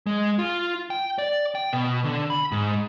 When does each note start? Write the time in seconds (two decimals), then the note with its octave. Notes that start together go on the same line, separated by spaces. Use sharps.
0.06 G#3
0.39 F4
0.90 G5
1.18 D5
1.55 G5
1.73 B2
2.04 D3
2.30 B5
2.52 G#2